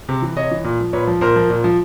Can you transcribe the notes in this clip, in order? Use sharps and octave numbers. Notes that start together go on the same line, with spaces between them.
C3
E3
C3 C#5 D#5
E3
A#2
F3
A#2 B4 C#5
F3
A#2 A#4 C5
F3
A#2
F3